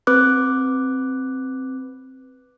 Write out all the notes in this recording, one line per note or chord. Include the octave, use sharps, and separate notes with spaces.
C4 B4 D6 F#6